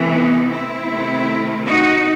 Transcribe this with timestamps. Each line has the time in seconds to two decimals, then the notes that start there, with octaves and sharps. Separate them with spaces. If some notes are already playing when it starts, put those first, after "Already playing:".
Already playing: C3 E3 A3
0.11 B3 D#4
0.50 C4 E4
0.88 C3 D#3 A3
1.66 D#4 F#4